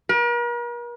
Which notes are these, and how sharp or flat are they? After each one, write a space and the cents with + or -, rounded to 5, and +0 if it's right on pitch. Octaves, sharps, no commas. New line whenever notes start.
A#4 +45